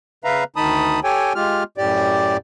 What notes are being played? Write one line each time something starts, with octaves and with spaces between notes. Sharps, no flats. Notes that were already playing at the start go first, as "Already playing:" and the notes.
C#3 B4 E5 F5 A#5
D2 D#3 D#4 A5 B5 D#6
G4 A4 C#5 G5 G#5
G#3 F4 G4 F6
F#2 A2 G4 D5